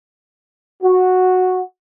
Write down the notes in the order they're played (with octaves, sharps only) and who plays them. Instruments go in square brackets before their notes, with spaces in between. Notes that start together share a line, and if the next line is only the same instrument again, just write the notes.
[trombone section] F#4